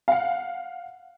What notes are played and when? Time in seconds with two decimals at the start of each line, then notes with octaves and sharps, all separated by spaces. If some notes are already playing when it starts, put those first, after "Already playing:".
0.08 F5 F#5